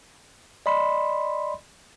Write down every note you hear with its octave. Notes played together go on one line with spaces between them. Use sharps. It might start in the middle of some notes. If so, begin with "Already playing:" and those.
D5 D#5 B5 C6